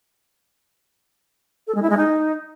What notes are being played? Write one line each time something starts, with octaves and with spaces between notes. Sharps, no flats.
A4
G#3
E4
G#3
D#4